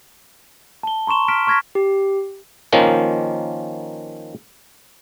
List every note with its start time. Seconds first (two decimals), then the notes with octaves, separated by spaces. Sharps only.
0.83 A5 G7
1.07 A#5 C6 C#6 E7 G7
1.28 F6 B6 D7 E7
1.47 C#6 F6 G#6 A#6 B6
1.75 G4
2.73 D#3 F3 A#3 C#4